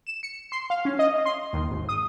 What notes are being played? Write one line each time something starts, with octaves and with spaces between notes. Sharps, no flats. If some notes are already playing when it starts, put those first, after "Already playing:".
E7
C#7
C6
F5
C#4
D#5
C6
D#2
G#1
D#6